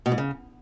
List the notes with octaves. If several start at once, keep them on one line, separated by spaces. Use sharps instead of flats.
B2
G#2
C#3